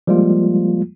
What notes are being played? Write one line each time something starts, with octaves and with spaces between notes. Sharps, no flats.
F3 G3 G#3 A#3 F4